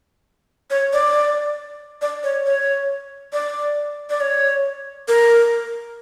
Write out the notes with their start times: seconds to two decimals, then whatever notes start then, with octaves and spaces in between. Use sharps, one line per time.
0.71 C#5
0.93 D5
2.02 D5
2.24 C#5
2.46 C#5
3.33 D5
4.10 D5
4.21 C#5
5.08 A#4